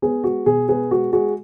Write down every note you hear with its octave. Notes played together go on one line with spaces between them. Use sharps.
B3 G#4
G#3 F#4
B2 G#4
B3 G#4
G#3 F#4
G#3 F#4